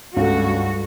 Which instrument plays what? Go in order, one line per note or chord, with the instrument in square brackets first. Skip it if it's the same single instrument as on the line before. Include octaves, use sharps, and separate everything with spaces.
[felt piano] C#2 A3 [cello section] G2 F#4